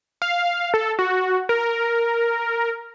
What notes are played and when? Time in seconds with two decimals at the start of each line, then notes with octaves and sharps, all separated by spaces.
0.22 F5
0.74 A4
0.99 F#4
1.49 A#4